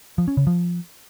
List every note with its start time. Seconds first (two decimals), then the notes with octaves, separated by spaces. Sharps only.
0.18 F3
0.28 C#4
0.37 C#3
0.47 F3